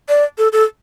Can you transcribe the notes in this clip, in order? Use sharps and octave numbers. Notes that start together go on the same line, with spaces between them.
D5
A4
A4